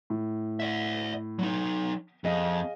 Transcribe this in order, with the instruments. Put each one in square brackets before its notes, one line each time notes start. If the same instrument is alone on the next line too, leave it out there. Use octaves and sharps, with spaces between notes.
[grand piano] A2
[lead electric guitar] D5 E5
F#3 D#4
[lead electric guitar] F2 [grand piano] G#4 D#5 F5